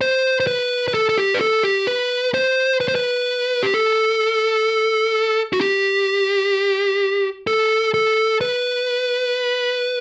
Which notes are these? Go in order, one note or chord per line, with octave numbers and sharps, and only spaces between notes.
C5
C5
B4
B4
A4
A4
G4
B4
A4
G4
B4
C5
B4
C5
B4
G4
A4
F#4
G4
A4
A4
B4